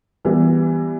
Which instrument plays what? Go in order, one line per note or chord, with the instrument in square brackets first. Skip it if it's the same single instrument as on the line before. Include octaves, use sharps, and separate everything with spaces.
[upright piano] E3 G3 B3